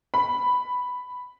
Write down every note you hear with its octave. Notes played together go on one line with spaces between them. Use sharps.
B5